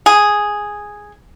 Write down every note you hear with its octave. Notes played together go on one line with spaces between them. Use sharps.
G#4